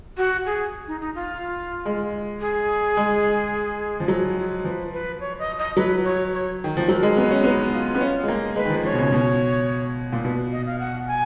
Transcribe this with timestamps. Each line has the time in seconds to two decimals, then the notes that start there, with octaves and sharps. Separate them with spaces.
0.17 F#4
0.46 G#4
0.87 D#4
1.00 D#4
1.15 F4
1.85 G#3
2.40 G#4
2.97 G#3
4.00 F3
4.08 F#3
4.65 F3 B4
4.92 B4
5.20 C#5
5.39 D#5
5.58 D#5
5.77 F#3 B4
6.04 C#5
6.33 C#5
6.64 D#3
6.77 F3
6.88 F#3 A#4
7.03 G#3
7.17 B3
7.31 C#4
7.44 B3 D#4
7.73 F4
7.95 B3
8.01 C#4
8.23 G#3
8.28 A#3
8.56 G#3 B4
8.65 D#3
8.70 F3
8.84 F3 C#5
8.93 B2
8.98 C#3
9.12 B2
10.12 A#2
10.24 B2 B4
10.52 D#5
10.66 F5
10.80 F#5
11.08 G#5